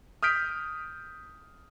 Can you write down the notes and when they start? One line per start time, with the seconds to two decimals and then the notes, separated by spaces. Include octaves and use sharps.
0.23 D#6 F6 G6 B6 D7